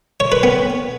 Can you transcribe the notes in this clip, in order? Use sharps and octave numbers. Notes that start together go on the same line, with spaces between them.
C#5
B4
B3